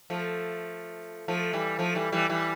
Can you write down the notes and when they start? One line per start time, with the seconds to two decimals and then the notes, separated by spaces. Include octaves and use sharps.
0.10 F3 A3
1.28 F3 A3
1.53 E3 G3
1.79 F3 A3
1.95 E3 G3
2.12 E3 G3
2.30 E3 G3